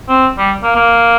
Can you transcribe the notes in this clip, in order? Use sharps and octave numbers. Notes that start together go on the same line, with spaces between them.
C4
G3
A#3
A#3